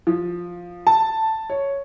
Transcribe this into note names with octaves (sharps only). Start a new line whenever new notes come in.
F3
A5
C#5